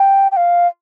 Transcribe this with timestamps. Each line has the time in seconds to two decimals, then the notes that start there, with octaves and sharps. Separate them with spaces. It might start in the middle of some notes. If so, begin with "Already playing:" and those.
Already playing: G5
0.32 G5
0.37 F5